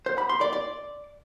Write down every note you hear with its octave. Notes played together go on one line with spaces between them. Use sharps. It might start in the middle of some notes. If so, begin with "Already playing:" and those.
C5
B5
C6
D5
D5